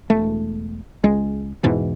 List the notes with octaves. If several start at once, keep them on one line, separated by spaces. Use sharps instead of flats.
E1 A3
C#2 G#3
E2 G#2 B2 E3